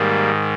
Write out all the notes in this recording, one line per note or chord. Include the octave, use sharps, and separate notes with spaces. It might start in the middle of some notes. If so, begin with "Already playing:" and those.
Already playing: G#2 D#3 G3 A#3